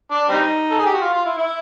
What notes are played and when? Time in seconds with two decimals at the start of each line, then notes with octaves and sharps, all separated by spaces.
0.11 D4
0.29 G3 C4 D#4
0.71 A4
0.78 G#4
0.86 G4
0.93 F#4
1.01 F4
1.13 F4
1.26 E4
1.38 E4